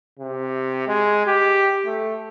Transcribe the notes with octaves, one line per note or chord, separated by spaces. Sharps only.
C3
G#3
G4
A3